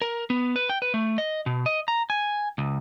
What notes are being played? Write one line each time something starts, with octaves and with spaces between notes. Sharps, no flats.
A#4
B3
B4
G5
B4
A3
D#5
B2
D#5
A#5
G#5
C#2